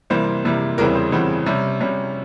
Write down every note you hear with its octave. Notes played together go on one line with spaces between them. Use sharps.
C3 E3 G3 A#3 C5
C3 E3 G3 A#3
E2 C#3 E3 G3 C4 A#4
C5
E2 C#3 E3 G3 C4
C3 G3 C#4
C3 G3 C#4